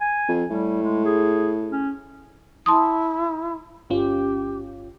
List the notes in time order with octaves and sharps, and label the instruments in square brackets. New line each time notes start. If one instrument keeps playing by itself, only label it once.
[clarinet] G#5
[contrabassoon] F2
[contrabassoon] A2 [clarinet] G3
[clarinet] G#3
G#4
C#4
[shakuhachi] E4 [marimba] A5 C6 D#6
[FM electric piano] G1 C#4 F4 [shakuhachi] G4